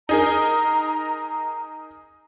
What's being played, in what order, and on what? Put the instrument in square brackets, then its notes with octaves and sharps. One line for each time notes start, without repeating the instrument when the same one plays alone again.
[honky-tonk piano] D#4 G#4 A#4 [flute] A#5